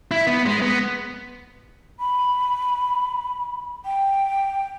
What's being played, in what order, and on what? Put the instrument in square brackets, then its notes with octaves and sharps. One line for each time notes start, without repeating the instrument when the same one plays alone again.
[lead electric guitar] E4
B3
G#3
B3
[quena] B5
G5